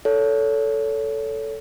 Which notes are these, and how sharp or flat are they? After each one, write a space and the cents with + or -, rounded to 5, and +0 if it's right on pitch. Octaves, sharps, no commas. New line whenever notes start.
A4 +0 C#5 +30